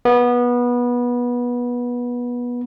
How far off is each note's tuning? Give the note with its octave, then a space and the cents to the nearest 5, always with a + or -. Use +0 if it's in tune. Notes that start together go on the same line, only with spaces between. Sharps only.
B3 -20